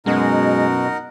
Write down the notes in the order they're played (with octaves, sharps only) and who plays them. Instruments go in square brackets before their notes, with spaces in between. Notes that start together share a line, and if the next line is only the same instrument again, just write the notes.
[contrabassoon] F#2 [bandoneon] B2 [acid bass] G#3 [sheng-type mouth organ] D#4 A#4 F#5